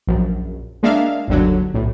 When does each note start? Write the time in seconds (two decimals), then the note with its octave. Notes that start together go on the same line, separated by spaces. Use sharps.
0.07 A#1 F#2
0.83 G#3 A#3 D4 E5 F5
1.28 G1 D#2 D3 F#3
1.74 B1 A2